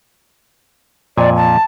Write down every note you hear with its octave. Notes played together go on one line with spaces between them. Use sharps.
F2 A#2 D5 G#5
A5